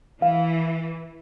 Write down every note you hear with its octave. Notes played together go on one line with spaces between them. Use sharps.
E3 F5